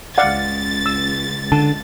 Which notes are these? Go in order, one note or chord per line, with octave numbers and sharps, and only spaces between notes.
C#2 D5 F5 F#5 A6
E6
D3 A5